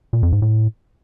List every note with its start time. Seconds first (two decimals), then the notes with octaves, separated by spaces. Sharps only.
0.13 A#2
0.23 F2
0.32 G#2
0.42 A2